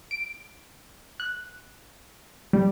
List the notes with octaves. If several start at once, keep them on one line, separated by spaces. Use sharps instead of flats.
D7
F#6
G3